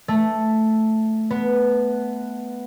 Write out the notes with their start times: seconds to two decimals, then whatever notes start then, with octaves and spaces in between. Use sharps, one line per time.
0.08 A3
1.30 B3